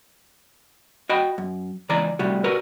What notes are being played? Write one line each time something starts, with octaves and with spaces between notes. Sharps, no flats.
F#4 D#5 G5 B5
F#2
C#2 E3 D5 A#5
A2 C3 G3 F#4
F#4 A#4 B4